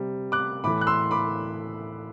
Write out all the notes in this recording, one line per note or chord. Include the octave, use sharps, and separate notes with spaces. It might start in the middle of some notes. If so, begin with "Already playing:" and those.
Already playing: C3 G3
D6 F#6
A2 E3 A3 B5 D6
F#6
C6 E6
B5 D6